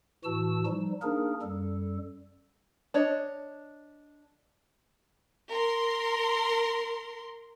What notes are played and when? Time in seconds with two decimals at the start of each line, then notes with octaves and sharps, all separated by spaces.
0.24 A2 E3 F#4 A5 E6
0.66 F3 G3 D#4
1.02 A#3 D4 D#4 G#4 A#4
1.42 F#2 G3 A4
2.94 D4 C#5 D#5
5.51 A#4 C6